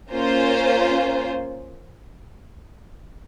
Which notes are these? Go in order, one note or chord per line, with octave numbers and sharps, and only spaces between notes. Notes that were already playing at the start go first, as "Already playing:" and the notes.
A#3 C#4 F4 C5